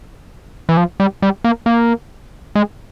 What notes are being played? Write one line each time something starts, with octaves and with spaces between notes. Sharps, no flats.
E3
F3
G3
G3
A#3
A#3
G#3